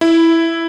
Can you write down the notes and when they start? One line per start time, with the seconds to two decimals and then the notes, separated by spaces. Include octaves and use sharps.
0.01 E4